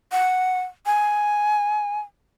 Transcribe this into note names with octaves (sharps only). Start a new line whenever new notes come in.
F#5
G#5